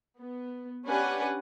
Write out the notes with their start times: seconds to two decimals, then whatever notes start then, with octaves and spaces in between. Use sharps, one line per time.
0.19 B3
0.86 C#4 D4 G4 B4 F#5 G#5